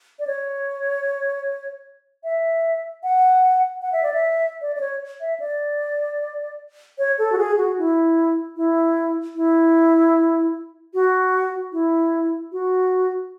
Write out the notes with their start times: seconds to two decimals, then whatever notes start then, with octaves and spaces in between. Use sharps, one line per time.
0.19 D5
0.27 C#5
2.24 E5
3.03 F#5
3.82 F#5
3.92 E5
4.03 D5
4.14 E5
4.61 D5
4.76 D5
4.80 C#5
5.21 E5
5.40 D5
6.98 C#5
7.18 A4
7.32 F#4
7.38 G#4
7.57 F#4
7.78 E4
8.56 E4
9.36 E4
10.94 F#4
11.72 E4
12.52 F#4